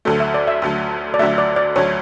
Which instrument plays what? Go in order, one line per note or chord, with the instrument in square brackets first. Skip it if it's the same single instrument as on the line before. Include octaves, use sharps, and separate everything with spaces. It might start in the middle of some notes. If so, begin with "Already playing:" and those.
[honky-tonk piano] D2 D3 F#3 A3 [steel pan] A4
[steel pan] E5
D5
E5
[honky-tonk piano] D2 D3 F#3 A3
[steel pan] D5
[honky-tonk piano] D2 D3 F#3 A3 [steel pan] E5
[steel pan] D5
D5
[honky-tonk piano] D2 D3 F#3 A3 [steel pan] C#5